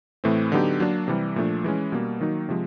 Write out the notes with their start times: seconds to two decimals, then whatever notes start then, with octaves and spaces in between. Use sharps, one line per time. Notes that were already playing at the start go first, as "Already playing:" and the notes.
0.24 A2 E3 A3 C4
0.52 D3 F#3 B3 D#4 G4
0.80 F#3 A#3 D4
1.08 C3 E3 G3
1.36 A#2 F3 A3 D4
1.64 E3 G#3 C#4
1.92 B2 G3 A#3
2.21 D#3 F#3 A#3 D#4
2.49 C3 F3 G#3